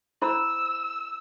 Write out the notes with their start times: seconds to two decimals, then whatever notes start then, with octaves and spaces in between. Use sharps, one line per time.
0.22 E4 C5 B5 E6